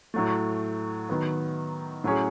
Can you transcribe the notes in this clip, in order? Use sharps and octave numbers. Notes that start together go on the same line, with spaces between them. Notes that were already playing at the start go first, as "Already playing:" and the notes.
A2 F#3 A3
D#3 F#3 B3
A2 F#3 C#4 G#4